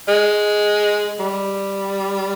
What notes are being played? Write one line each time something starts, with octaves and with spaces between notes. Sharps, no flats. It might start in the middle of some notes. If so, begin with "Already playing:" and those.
G#3
G3